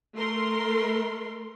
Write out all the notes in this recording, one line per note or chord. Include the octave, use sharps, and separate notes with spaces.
A3 A#4 C6